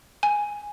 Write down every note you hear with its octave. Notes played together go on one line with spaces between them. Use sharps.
G#5